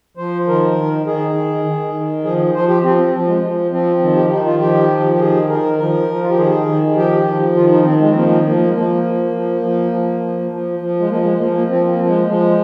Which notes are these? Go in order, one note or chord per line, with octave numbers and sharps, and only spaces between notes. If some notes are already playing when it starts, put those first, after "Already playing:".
F3 C5
D#3 A#4
D#3
D#3 G#4
D#3
D#3
D#3
F3 G#4
F3 C5
G4
F3 C4
C4
F3
G#3
F3
F3 C4
D#3
G4
D#3 D#4
F4
F3 G4
F3
G4
D#3 G#4
D#3 A#4
F3 A#4
F3
F4
G4
D#3 G#4
D#3
F3 G4
F3
D#3 F4
D#4
D#3 C4
G#3
C4
F3 A#3
A#3
F3 A#3
A#3
G#3
F3 A#3
F3
F3
F3
F3
F3
F3
F3
G#3
F3 A#3
G#3
F3 A#3
A#3
F3 C4
A#3
F3
G#3
F3 G#3